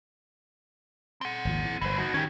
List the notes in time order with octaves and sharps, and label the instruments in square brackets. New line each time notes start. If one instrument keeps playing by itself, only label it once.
[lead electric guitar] C4 F#5
[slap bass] G#1 D#2 F3
E3
[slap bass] G1 [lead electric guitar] E3 C5
[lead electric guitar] D#4 F#4
[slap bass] D#3 [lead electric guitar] C#4 G4